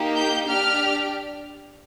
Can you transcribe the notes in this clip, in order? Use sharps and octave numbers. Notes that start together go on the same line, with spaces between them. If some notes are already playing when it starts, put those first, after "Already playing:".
Already playing: A#3 D#4 G4
G6
D4 G4 F6